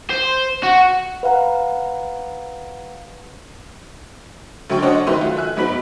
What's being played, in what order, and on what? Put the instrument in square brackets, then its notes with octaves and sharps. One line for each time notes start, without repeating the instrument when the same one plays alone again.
[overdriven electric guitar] C5
F#4
[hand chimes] B4 F5 F#5 A#5
[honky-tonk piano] D2 F#3 A3 G5 C#6
D4 C5 C#5 D#5 F#5
D#3 F#3 A3 B4 C6 D#7
A3 F4 F#4
E5 G#5 F#6
G#2 F#3 B3 B5 B6 F#7